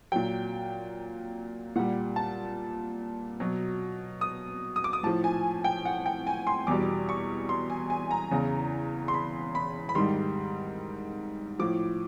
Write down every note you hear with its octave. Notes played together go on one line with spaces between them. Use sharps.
A#2 F#3 G5
A#2 G3 F#5
A5
B2 F#3
D#6
D#6
D6
D#6
A2 F3 A5
G#5
G5
F#5
G5
G#5
C6
E2 B2 G3 D6
C#6
C6
G#5
G#5
A#5
E2 C#3 E3
C6
B5
B5
B5
G#2 D#3 G3 C6
A2 F3 D6